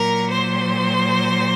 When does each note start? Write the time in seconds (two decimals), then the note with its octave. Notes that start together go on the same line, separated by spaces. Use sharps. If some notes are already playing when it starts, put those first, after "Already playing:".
Already playing: A#2 F#3 A#4 A#5
0.30 C5 C6